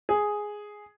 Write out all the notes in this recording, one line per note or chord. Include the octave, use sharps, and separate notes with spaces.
G#4